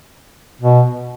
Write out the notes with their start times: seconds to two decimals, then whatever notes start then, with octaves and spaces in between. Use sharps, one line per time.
0.61 B2